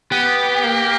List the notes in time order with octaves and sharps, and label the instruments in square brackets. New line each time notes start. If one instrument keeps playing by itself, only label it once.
[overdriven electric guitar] B3 [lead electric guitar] G4
[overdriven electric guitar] A#3